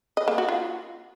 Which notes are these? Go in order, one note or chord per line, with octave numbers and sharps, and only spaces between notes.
D#5
A#3
F#4
F4